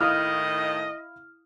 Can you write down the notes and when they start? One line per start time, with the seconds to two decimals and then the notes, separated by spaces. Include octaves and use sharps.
0.01 A2 D#3 E4 D#5 F5 D#6 F6